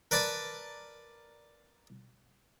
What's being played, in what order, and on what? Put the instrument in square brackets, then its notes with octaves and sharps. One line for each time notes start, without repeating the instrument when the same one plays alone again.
[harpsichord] A#4 B4 D5 A5 B5